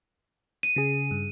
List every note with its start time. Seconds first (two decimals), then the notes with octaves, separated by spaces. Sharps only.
0.63 D#7
0.76 C#3 G#4
1.11 G2